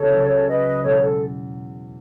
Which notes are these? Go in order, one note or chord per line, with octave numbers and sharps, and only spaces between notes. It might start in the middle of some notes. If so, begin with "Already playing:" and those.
Already playing: C#2 B3 F#4 A4 C#5
C#3 F#3 C#4
B4 D#5
E2 B2 G#3 A4 C#5
B4
A4